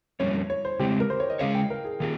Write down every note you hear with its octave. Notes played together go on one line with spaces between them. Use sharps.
F2 C3 G3 A#3 C#4 C#5
C#5
C5
C#3 G#3 C4 G4
A#4
C5
C#5
D#5
C#3 G#3 C#4 G#4 C#5 F5
G5
A#4
G#4
D#3 A#3 F4 G#4